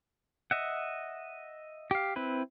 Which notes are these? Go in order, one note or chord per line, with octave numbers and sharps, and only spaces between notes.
D#5 E5 F#5
G4 F5
C4 E4 B4